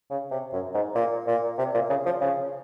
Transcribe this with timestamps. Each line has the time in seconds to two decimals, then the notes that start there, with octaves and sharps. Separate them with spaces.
0.10 C#3
0.31 C3
0.53 F#2
0.74 G#2
0.94 A#2
1.27 A#2
1.58 C3
1.74 A#2
1.89 C#3
2.05 F3
2.21 C#3